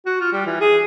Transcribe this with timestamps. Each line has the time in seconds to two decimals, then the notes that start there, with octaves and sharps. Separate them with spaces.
0.06 F#4
0.20 F4
0.32 G3
0.46 E3
0.61 G#4